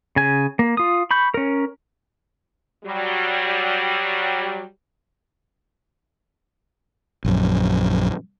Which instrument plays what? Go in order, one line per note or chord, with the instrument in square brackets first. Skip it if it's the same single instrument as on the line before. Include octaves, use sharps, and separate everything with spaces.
[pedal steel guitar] C#3 G#5
A#3
F4 D#6
B5 C#6 G6
C#4 A#4
[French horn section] F#3 G3
[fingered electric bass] A#1 F#2